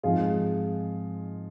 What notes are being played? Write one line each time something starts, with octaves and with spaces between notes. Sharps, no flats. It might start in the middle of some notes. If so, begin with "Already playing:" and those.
G#2 F3 G#3 C4 F4 G#4